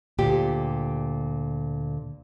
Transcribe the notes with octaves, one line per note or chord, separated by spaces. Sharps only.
D2 A#2 G4